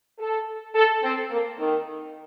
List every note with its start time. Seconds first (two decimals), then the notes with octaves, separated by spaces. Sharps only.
0.19 A4
0.75 A4
1.04 C4
1.31 A#3
1.59 D#3